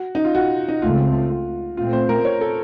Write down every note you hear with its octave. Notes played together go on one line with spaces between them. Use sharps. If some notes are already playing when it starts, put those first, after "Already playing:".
Already playing: F#4
D#4
F4
F#4
D#4
C#2 C#3 A3 C4 F4
F4
A#2 A3 C4 F4
C5
A#4
C#5
A4